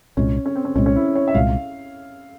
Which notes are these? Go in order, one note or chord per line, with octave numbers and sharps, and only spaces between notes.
C2 A#2 G#3 C#4
C#4
C4
C#4
C2 A#2 G#3 C#4
C#4
E4
C#5
E5
C2 A#2 G#3 F5